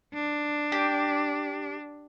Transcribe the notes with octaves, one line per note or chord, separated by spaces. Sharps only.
D4
G4